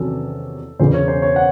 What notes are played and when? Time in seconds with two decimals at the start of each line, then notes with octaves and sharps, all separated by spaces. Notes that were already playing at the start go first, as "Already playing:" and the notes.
Already playing: E2 C3 D#3 F#3 C#4 A4
0.80 E1 E2 C#3 C5
0.94 C#5
1.08 C5
1.22 C#5
1.36 F#5